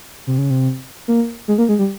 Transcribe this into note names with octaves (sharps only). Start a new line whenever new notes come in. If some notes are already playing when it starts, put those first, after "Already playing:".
C3
C#3
C3
A#3
G#3
A#3
G#3
G3